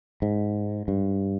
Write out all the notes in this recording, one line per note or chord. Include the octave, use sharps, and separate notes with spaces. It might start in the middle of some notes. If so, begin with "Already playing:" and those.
G#2
G2